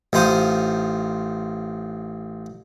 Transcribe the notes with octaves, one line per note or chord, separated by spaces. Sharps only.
A1 D#4 F4 C5 D#6